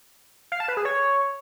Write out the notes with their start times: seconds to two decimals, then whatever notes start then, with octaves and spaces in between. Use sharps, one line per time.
0.52 F5
0.60 A5
0.68 B4
0.77 G#4
0.85 C#5